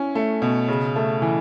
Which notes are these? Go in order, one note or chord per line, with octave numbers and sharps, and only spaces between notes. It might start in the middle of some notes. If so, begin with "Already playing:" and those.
Already playing: C#4 E4
A3
B2
C#3
A3
E3